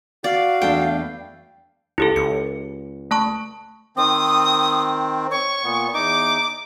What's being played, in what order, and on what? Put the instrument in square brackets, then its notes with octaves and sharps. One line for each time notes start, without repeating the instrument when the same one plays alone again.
[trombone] F#4 [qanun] D5 [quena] F5
[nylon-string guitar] E2 A3 D4 [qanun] G5
[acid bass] C#2 [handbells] E4 G4 A4
[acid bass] C#2 [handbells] C#7
[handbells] A3 A5 C#6
[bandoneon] D#3 C4 [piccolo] D#6
[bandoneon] C#5 [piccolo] C#6
[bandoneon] A#2 B3
[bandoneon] E2 D#4 [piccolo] D6